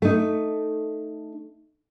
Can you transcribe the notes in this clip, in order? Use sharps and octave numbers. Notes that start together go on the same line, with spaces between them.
A3 D#4